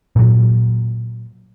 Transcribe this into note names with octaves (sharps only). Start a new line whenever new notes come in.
A#2 F#3